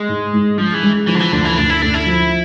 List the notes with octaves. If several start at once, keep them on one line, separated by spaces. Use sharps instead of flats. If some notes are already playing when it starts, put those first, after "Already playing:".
Already playing: G#3
G#2
G#2
F3 G#3
E3
G#3
E3 F3
D3
E3
D2 D3
E3
D2 D4
E4
D2 D4
E4
F3